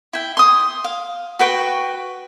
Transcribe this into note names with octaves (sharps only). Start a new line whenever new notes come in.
E4 G5
C6 D#6
F5
F#4 B4 G5 C#6